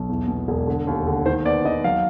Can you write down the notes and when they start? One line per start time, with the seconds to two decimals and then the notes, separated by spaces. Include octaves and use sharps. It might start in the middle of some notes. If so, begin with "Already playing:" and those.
Already playing: B1
0.09 E2
0.28 B2
0.48 E1
0.67 D3
0.87 D#2
1.07 D3
1.26 D#3 C5
1.45 B3 D5
1.65 D#3 D#5
1.84 F#3 F5